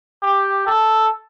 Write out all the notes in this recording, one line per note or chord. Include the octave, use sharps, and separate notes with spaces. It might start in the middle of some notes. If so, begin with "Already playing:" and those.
G4
A4